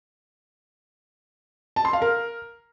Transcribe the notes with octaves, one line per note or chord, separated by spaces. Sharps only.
A5
C6
F5
A#4